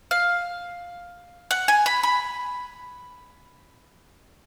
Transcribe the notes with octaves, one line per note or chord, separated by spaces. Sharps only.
F5
F#5
G#5
B5
B5